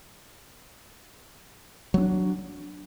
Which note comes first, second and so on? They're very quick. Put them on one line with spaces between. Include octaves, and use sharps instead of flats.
F#3 C4 D4